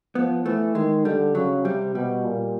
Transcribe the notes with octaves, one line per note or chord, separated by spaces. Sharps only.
F3 B3
E3 A3
D#3 G#3
D3 G3
C#3 F#3
C3 G3
B2 G3
A#2